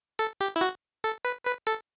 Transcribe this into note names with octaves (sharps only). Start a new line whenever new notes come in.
A4
G4
E4
F#4
A4
B4
B4
A4